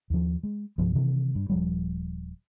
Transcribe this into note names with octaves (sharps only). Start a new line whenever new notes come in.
D#2 F3
G#3
C2 G2 F3 B3
C3 D#3 E3
G2
D#1 F3 G3